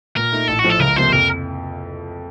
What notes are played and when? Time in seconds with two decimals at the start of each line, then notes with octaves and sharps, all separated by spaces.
0.16 A#2 A#4
0.32 A3 D#4
0.48 A1 A4
0.59 F#4
0.64 A2 F3 A3
0.70 A4
0.80 C#2 A#4
0.96 C3 F3 A#3 C5
1.13 F2 A#4